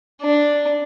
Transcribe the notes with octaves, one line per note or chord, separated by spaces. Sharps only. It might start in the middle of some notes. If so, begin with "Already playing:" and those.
D4